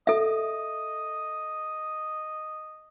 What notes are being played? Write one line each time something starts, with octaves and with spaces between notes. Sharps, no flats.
A4 D#5 E5